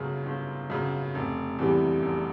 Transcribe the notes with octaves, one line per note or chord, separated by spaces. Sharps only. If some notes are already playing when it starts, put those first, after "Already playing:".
Already playing: G1 F#2 C#3
G1
F#2 C#3
F1
E2 C3 E3 G3
F1